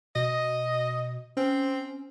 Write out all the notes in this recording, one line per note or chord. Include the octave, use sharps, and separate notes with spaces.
B2 D#5
C4 C#4